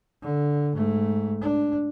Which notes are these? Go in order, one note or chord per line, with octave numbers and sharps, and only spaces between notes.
D3
G#2 A3
D4